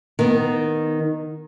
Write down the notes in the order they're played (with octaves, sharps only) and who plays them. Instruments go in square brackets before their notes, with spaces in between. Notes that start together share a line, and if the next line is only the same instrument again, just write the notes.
[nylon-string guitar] D#3 B3